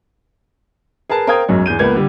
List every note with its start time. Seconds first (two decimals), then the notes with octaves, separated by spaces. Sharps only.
1.10 G#4 A#4 B4 A5
1.27 A#4 C5 F5 G5 D#6 G#6
1.48 B1 F#2 G#3 C#4
1.66 E2 G#4 G6 D#7
1.79 C#2 A#3 B3 B4 G#6
1.95 D3 G3 G4